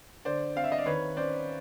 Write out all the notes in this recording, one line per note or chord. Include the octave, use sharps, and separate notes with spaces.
D3 C5 D5
C4 F5
E5
D#5
D5
D#3 B4 C#5
C#4 C5 D5